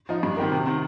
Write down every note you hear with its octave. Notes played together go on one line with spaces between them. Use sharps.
F3 D#4
G2
D#3 C4 G4 A#4
C3
D#3 C4